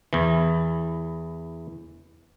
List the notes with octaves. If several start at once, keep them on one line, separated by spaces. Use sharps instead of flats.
E2 E3